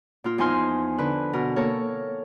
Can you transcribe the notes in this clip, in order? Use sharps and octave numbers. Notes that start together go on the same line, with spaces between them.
A#2 F4
E2 F3 D#4 G#5 C6 F6
D3 B4
B2 A#4
A#3 A4 A#4 C#5